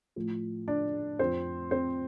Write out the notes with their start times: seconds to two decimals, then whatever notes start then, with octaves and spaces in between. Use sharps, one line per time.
0.16 A2 F3
0.68 D4 D5
1.19 F2 F3 C4 C5
1.71 C4 C5